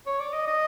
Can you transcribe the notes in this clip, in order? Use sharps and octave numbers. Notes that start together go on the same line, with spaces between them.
C#5
D5
D#5
D#5